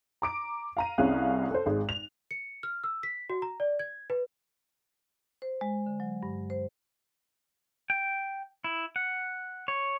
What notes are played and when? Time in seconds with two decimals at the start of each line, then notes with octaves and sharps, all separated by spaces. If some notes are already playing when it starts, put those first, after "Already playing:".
0.22 A#5 D6 D7
0.77 F5 A#5 D#7
0.98 C2 C3 C#4 G#4 F5 F#6
1.51 A4 C5
1.66 G#1 G#3
1.89 F7
2.31 C#7
2.63 F6
2.84 E6
3.03 B6
3.30 F#4
3.42 A#5
3.60 D5
3.79 G#6
4.10 B4
5.42 C5
5.61 G#3
5.86 D3
6.00 F#3
6.23 G2
6.50 C5
7.90 G5
8.64 E4
8.96 F#5
9.68 C#5